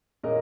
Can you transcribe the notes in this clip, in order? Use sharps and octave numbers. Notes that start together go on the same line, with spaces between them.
A#2 G#3 C#4 A#4 D#5